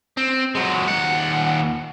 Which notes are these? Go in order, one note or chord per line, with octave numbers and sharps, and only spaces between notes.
C4
F#3 G#3
D#2 F#5